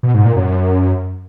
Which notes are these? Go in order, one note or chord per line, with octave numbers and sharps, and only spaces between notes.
B2
G#2
A#2
F#2
F#2